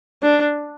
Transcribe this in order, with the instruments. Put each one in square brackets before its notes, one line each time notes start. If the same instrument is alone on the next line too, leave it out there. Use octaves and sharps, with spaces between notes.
[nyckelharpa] D4